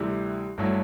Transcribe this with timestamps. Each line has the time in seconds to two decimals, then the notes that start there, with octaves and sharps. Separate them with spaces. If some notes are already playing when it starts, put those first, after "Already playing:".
Already playing: D2 C3 E3 G3
0.58 G1 G2 F#3 A3 E4